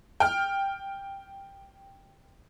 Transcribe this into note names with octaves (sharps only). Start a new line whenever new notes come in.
G5 F6